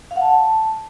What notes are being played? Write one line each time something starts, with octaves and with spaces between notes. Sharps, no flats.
F5
F#5
A5